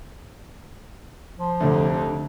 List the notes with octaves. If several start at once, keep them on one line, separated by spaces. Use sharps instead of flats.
F3
F1 D2